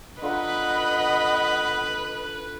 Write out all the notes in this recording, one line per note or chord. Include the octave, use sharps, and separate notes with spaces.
D3 F4 B4 D#5 F#5 A#5 B5